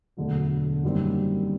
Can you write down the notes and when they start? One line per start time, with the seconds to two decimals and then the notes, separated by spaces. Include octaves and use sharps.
0.17 E1 D2 D3 F#3
0.83 F#1 F#2 D#3 G3 C4